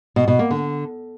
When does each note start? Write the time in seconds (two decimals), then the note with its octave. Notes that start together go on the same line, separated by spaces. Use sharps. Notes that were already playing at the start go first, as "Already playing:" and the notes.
0.16 B2
0.28 B2
0.39 A#3
0.51 D3